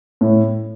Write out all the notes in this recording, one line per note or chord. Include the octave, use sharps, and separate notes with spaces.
A2